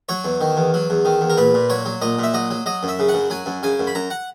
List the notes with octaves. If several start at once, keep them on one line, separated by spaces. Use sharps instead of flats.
F#3 C#5
E2
D#3
E2
F#3
E2
D#3
E2
A#4
A#2 B4
A#2
F#3 C#5
F#3
A#2 D#5
A#2 E5
F#3 D#5
F#3
F#3 D#5
F#2
E5
C#3
F#5
F#2
F#3 G#5
F#2
C#3 G#5
F#2
B5
F#2 A#5
F#5